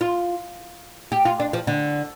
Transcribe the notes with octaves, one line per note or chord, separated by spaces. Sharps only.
F4
G4
F4
D4
F3
D3